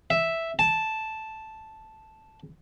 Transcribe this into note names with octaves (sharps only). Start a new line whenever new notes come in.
E5
A5